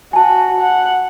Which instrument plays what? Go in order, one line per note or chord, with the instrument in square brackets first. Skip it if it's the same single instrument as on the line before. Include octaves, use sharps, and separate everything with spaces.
[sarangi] F#4 [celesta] G#5 A5
[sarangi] F#5